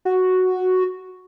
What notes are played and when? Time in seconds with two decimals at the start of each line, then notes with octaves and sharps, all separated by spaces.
0.05 F#4